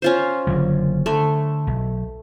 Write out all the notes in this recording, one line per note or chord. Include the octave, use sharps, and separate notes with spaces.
C#4 F4 C5
F#1 D3 F#3
D3 A3
B1